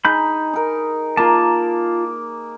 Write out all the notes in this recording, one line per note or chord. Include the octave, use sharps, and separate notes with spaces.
D#4 G#4 B5 G6
D#4 A#4
A#3 F4 A5